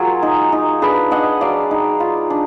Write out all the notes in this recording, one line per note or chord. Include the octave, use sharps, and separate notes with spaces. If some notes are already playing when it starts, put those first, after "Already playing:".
Already playing: F#3 F4 G#4 A#4
D#4
D#4
D4 G#4 B4
D4 D#5 F#5
F#3 D5 F5
D#4
F4
D4